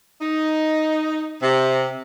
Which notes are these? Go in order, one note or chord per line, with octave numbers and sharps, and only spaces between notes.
D#4
C3